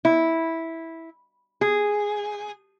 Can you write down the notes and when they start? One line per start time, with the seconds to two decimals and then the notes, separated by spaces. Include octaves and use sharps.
0.05 E4
1.61 G#4